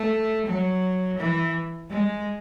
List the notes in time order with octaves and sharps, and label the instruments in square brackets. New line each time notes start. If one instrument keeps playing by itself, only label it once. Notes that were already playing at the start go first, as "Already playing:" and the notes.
Already playing: [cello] A3
F#3
E3
G#3